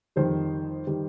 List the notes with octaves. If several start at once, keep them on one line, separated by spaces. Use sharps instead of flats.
F2 D#3 G3 C5
D#3 G3